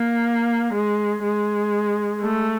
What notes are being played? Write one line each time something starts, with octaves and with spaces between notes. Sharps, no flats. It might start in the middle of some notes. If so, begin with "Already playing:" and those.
Already playing: A#3
G#3
G#3
A3